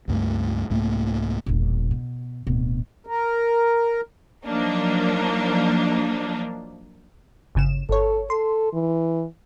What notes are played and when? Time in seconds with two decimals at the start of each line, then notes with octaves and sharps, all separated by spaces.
0.08 C#2 G2 A3
0.70 C2 G#2 A3 A#3
1.46 E1 A#1
1.91 B2
2.47 D1 B2
3.07 A#4
4.46 F3 F#3 A#3 D4 D#4
7.55 G1 C#3 E7
7.89 G1 A4 C#5
8.30 A4 C6
8.73 E3